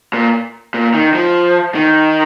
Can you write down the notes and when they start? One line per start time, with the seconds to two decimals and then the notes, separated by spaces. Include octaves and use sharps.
0.13 A#2
0.74 A#2
0.94 D#3
1.14 F3
1.75 D#3